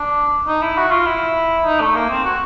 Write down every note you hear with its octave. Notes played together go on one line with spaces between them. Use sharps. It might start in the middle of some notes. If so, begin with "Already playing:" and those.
Already playing: D4
D#4
E4
F#4
F4
E4
D#4
A3
A#3
C4
F#4